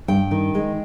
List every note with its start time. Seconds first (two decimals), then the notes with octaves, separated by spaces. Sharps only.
0.08 G2 G5
0.31 D#3
0.55 G#3